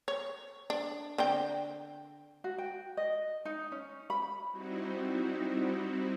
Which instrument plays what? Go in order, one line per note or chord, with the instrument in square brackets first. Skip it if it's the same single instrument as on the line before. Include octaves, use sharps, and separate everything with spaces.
[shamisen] C#5
D4
D3 C4 G5
[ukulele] F#4
G5
D#5
D#4
C#4
B5
[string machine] G3 C4 D#4 E4 F#4